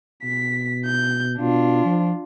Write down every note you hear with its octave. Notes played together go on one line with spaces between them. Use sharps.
B2 B6
G6
B2 D4 F4
F3